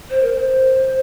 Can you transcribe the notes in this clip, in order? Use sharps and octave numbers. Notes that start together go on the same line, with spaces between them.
C5
A#4
C5